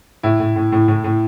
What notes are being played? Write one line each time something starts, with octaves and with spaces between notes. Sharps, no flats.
A2 E4
A2
A2
A2
A2
A2